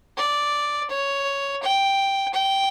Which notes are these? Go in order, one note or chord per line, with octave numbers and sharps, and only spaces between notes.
D5
C#5
G5
G5